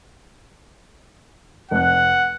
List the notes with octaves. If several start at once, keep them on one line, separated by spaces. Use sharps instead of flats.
F1 F#5 F#6